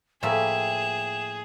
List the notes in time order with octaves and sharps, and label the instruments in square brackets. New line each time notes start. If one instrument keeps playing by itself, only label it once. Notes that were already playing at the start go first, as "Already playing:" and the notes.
[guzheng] A2 F3 A#3 [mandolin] G4 E5 G#5 [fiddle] G#4 [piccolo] E7